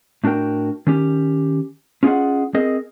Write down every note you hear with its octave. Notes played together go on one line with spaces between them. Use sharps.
A2 D4 F#4 A#4 G5
D#3 C#4 G4
C#4 F4 G#4 D5 D#5 F#5
C4 G#4 A#4 D#5